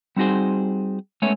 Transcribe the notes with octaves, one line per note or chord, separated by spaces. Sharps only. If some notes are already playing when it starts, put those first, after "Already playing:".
G3 C4 D#4 F#4 G#4 C5
G#3 A3 B3 C#4 C#5 E5